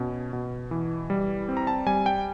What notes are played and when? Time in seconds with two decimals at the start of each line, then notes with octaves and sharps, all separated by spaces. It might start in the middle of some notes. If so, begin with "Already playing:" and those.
Already playing: B2 C#4
0.33 B2
0.71 E3
1.10 G3
1.49 C4
1.57 A#5
1.67 A5
1.87 G3 G#5
2.06 G5